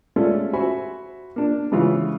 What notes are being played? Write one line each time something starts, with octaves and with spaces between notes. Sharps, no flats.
G#3 A3 C#4 F4 D5
F#4 C5 E5 G#5 B5
A#3 D4
G#2 C#3 E3 F4